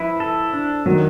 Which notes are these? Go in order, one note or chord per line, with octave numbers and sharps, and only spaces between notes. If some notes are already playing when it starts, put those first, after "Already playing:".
Already playing: F3 E4 B4
A4
D4
D#3 F#3